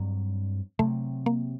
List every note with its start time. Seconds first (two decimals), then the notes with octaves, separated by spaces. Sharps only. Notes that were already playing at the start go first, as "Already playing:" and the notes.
Already playing: G2 F#3 C4
0.79 C3 F#3 A3 C4
1.26 A#3